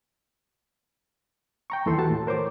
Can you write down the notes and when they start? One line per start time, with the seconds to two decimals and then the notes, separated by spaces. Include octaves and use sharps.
1.70 G5 A#5 C#6
1.86 D#2 E3 A4 C6
1.98 F#4 G4 A5
2.10 A2
2.27 A#4 C5 C#5 D6